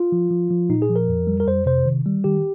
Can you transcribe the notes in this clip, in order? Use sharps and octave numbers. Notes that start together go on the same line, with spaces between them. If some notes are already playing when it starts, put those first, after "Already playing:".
Already playing: F4
F3
F3
F3
A#2 D#4
G#4
F3
A#4
F2
G3
A#4
F2 C5
C3 C5
D#3
G3
D#3 G4